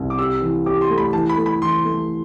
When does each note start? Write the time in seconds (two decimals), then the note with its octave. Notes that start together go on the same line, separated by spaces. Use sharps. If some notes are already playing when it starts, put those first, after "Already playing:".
Already playing: C2
0.10 D6
0.19 G4 E6
0.42 E3
0.66 G4 D6
0.81 C6
0.90 A3
0.98 B5
1.13 E3 A5
1.29 B5
1.37 A3
1.46 B5
1.62 E3 C6
1.85 A3